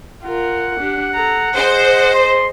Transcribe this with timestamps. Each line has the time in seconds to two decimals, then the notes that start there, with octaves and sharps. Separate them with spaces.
0.23 F4 A#4 F#5
0.80 D4 G4
1.15 A4 A#5
1.55 G#4 C5 D#5
2.14 C6